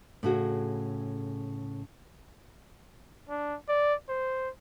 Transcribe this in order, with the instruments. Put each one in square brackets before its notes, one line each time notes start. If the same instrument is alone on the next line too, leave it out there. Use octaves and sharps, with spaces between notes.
[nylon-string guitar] A2 C#3 F#4 G#4
[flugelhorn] D4
D5
C5